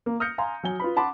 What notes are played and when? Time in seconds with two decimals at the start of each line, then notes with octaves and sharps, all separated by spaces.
0.06 A#3
0.20 D#6 F6 G6 A#6 C#7
0.38 F5 G#5 A#5 C6
0.63 F#3 G#5 G7
0.80 F4 B4 B5
0.96 F#5 A5 B5 C6 D6